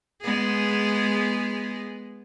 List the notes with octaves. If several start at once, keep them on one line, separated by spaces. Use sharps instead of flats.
G#3 B3 G#4